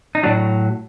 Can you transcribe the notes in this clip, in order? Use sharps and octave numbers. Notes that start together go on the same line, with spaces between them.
D#4
A2 F#3 D4